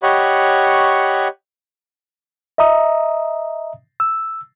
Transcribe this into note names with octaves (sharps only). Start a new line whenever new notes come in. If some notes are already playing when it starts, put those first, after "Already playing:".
G4 C#5 D#5 F#5 B5 C#6
D#5 E5 A#5 D#6
E6